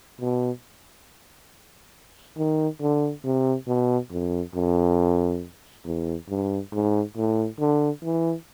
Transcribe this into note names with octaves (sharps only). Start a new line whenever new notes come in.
B2
D#3
D3
C3
B2
F2
F2
E2
G2
G#2
A2
D3
E3